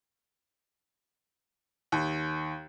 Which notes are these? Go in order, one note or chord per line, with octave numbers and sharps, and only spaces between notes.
D#2